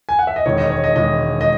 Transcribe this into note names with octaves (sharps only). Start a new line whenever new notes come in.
G#5
F#5
E5
D#5
E1 E2 D#3 G#3 C#5
D#5
C#5
D#5
E1 E2 D#3 G#3 D#5
D#5